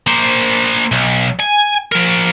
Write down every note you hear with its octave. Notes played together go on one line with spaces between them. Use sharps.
A#3 C5
B1
G#5
F3 A#4